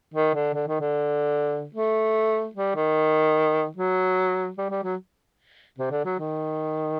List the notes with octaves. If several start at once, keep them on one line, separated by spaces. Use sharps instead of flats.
D#3
D3
D3
D#3
D3
A3
G3
D#3
F#3
G3
G3
F#3
C3
D3
F#3
D#3